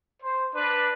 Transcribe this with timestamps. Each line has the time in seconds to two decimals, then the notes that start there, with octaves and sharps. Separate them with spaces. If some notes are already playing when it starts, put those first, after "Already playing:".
0.22 C5
0.54 D4 B4